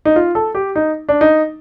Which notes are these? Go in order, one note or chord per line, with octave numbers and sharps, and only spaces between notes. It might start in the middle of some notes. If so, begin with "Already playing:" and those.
D#4
F4
A4
G4
D#4
D4
D#4